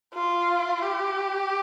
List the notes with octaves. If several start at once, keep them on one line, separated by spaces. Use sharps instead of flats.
F4
G4